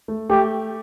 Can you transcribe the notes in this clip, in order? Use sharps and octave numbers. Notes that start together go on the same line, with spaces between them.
A3
A3 G4